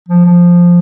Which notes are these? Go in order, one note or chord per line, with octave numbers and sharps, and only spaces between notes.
F3
F3